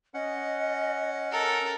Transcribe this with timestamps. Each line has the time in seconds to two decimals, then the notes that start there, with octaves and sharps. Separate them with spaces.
0.14 C#4 D#5 F#5
1.32 A4 A#4